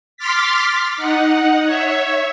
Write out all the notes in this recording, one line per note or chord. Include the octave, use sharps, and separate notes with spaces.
C6 D6 F6 A6 B6
D#4 F#5
C#5 E5